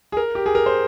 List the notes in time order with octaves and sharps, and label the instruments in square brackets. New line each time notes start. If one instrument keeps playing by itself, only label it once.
[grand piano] G#4
A#4
G4
G#4
A#4
C5